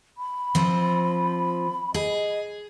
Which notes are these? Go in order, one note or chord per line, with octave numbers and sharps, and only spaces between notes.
B5
F3 C4
G#4 D#5